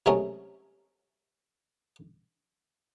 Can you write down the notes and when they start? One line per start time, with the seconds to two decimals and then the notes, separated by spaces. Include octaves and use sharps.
0.06 C3 F#3 G#3 A3 C#4 A#4